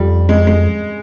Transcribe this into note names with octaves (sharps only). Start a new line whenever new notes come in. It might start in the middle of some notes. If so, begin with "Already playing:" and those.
Already playing: F2 G3
G#3
G#3